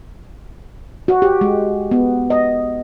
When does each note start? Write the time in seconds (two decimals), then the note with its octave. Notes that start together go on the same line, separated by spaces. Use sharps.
1.08 F#4
1.22 G4
1.41 G#3
1.91 B3
2.30 D#5